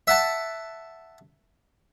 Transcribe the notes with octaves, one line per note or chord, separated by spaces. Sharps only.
E5 F#5 A5